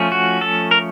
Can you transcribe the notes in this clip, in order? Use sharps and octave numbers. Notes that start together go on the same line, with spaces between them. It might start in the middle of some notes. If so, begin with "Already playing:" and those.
Already playing: F3 A3 C#4
F#4
A4
A#4